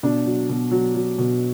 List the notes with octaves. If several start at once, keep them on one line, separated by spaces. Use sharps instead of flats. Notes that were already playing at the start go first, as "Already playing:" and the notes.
B2 D4
F#3
B2
F#3
F#3
B2